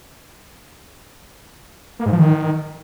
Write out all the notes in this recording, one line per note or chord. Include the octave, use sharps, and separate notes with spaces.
A#3
G#2
F3
D#3